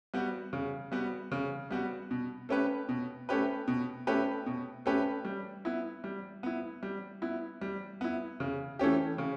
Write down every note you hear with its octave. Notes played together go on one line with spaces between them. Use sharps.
G3 B3 F#4
C#3
G3 B3 F#4
C#3
G3 B3 F#4
B2
A3 C#4 G4 B4
B2
A3 C#4 G4 B4
B2
A3 C#4 G4 B4
B2
A3 C#4 G4 B4
G3
B3 E4
G3
B3 E4
G3
B3 E4
G3
B3 E4
C#3
E3 A3 C#4 G4
C#3